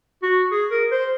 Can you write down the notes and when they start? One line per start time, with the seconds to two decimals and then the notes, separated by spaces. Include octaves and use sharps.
0.23 F#4
0.52 G#4
0.71 A#4
0.91 C5